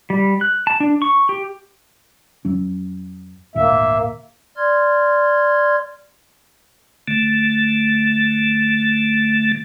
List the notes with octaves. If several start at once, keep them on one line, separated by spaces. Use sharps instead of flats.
G3
F#6
A5
D4
C#6
G4
F2 F#3 C#4
G#1 D2 A#2 A#3 E5
D5 C6 F6 G#6
D3 A3